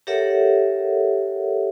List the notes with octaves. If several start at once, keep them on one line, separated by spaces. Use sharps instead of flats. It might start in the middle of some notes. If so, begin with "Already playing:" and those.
G4 A4 A#4 C#5 E5 F#5